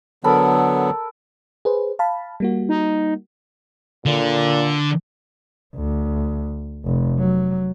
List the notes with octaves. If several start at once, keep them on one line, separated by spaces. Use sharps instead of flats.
D3 F#3 B3 A4 A#4 B5
G#4 B4 C5
F5 A5 B5
G3 A#3 F#4
D#4
A#2 D3
D2
F1
F#3